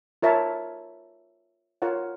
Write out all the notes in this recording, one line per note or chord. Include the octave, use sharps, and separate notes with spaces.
F4 A#4 C#5 E5 A5
F4 A#4 C#5 F#5